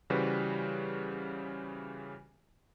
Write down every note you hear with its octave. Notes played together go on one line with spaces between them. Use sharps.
C#3 E3 G3 F#4 B4 C5